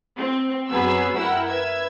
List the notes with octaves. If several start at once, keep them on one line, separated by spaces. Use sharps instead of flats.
C4
F#2 F#3 B3 G#4 B5 E6
E4 A#4 F#5 G5 E6
B4 E5 E6 G#6